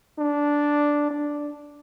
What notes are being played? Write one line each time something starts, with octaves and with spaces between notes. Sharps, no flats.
D4
D4